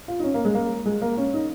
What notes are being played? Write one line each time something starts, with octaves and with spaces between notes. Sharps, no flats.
F4
D#4
C#4
A#3
G#3
A#3
G#3
A#3
C#4
D#4